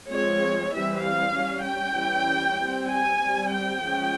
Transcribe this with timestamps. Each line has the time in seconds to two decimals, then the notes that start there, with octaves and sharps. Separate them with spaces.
0.10 F3 G#3 C4 C#5
0.73 E3 G3 C4 E5
1.04 F5
1.34 G3 C#4
1.65 G5
1.96 E3 G3 C#4
2.59 G3 C4
2.89 G#5
3.21 G3 C4
3.52 G5
3.82 F3 G#3 C#4